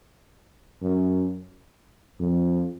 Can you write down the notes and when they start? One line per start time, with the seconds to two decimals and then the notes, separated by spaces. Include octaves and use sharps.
0.82 F#2
2.20 F2